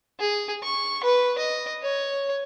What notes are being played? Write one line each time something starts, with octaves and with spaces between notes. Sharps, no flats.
G#4
C#6
B4
D#5
C#5